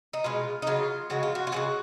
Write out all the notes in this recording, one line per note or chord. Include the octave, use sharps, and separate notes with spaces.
D#4
B2 G#3 F4
D#4
C#3 F#3 F4
C#3 F3 G#3 F#4
F4
F#4
F4
C#3 F3 G#3 F#4